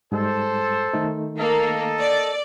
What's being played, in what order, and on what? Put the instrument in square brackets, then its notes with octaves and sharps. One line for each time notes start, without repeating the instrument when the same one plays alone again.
[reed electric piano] G#2 G3 G#3 [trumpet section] A4 C5
[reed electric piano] D#3 A3 D#4
[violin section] A#3 [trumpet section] A4 D#5
[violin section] D5